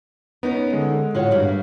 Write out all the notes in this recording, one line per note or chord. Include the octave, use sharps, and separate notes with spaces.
B3 C#4 D#4 A#4
D3 G#3
A2 F4 F#4 C#5
G2 G3 A3 A#3